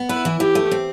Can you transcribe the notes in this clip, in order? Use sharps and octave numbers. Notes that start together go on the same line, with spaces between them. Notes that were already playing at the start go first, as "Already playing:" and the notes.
Already playing: B3
E4 B4
E3
E3 G4
A3
C4